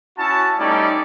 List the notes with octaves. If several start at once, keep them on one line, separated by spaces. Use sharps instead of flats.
C#4 E4 F#4 A5
G3 A3 C#4 D#4 D5